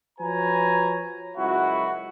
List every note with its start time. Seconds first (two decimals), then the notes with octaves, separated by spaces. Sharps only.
0.19 F3 F#4 B4 C#5 G#5 A#5
1.37 C#2 F#2 E4 F#4